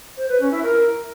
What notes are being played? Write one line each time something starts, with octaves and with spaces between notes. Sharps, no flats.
C5
B4
C#4
E4
A#4